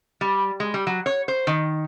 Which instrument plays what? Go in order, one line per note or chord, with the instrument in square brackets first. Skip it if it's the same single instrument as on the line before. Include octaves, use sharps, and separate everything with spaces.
[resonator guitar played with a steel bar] G3
G#3
G3
F#3
C#5
C5
D#3